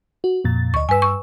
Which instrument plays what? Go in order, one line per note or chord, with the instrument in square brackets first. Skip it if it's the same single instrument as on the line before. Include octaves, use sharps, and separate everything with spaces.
[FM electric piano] F#4
F2 A#2 A6
[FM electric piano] D2 D#5 [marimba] C#6
[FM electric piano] G2 E6 [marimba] B4 G#5
[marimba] C#6